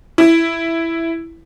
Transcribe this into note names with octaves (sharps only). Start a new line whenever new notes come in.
E4